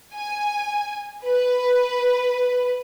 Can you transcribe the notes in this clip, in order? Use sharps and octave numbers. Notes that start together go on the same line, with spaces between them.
G#5
B4